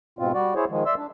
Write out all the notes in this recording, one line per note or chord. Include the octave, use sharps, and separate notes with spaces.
G#2 B2 C4 F4
G3 F#4 D5
E4 G#4 C5 C#5
D#3 F3 G#3
D5 E5 C6 E6
D4